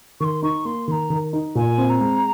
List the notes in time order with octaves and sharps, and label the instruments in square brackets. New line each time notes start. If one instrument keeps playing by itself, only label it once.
[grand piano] D#3 [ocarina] C6 C#6
[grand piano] D#4 [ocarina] C#6
[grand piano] A#3 [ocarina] C6
[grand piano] D#3 [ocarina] A#5 C6
[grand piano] D#3
D#4
[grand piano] A#2 [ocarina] G#5
[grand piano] C4
[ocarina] A#5
[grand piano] G#3